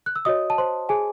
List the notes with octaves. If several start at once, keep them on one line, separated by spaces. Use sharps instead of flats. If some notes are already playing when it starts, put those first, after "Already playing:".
F#6
E6
F#4 C#5 D#5 D#6
A5
C5 C6
G#4 G#5